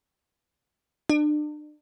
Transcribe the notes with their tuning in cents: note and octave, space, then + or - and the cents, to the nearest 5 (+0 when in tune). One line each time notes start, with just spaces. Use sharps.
D4 +35